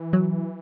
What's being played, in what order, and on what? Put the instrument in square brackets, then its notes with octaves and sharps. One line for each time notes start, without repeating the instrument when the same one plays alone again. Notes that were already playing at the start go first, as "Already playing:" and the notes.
Already playing: [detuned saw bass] E3
[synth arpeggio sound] F#3